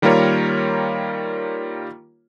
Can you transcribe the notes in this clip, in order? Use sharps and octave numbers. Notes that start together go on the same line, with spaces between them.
D#3 G3 A#3 F4 A#4 C#5